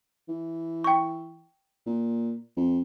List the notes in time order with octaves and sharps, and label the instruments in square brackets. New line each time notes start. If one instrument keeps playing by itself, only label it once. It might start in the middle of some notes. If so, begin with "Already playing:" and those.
[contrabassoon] E3
[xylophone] G5 C#6
[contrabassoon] A#2
F2